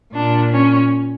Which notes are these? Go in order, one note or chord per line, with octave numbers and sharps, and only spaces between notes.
A#2 D4
C#4